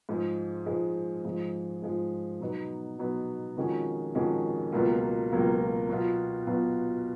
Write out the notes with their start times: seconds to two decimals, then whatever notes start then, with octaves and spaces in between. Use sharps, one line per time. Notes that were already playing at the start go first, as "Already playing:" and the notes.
0.09 G#2 F3 G#3
0.66 G#2 F3 G#3
1.25 G#2 F3 G#3
1.82 G#2 F3 G#3
2.40 B2 F#3 B3 D#4
2.99 B2 F#3 B3 D#4
3.57 F2 D#3 G#3 C#4 F#4
4.15 F2 D#3 G#3 C#4 F#4
4.72 C#2 B2 F#3 A#3 F4
5.31 C#2 B2 F#3 A#3 F4
5.89 B2 F#3 B3 F4
6.47 B2 F#3 B3 F4